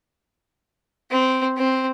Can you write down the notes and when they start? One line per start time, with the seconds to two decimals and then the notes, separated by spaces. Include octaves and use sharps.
1.11 C4
1.57 C4